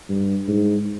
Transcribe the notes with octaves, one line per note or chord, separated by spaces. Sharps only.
G2
G#2